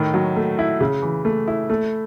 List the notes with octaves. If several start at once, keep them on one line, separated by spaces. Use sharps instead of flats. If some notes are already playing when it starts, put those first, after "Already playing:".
Already playing: A2 D#3
F#3
A3
E4
C#3
E3
A3
E4
A3